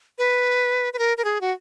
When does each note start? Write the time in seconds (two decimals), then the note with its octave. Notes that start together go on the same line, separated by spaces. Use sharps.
0.18 B4
0.93 B4
0.99 A#4
1.17 A#4
1.24 G#4
1.41 F#4